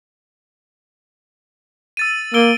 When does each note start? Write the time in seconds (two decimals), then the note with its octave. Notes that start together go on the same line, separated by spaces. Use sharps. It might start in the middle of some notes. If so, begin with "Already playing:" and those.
1.97 E6 A6 D#7
2.34 A#3 E6 D7 G7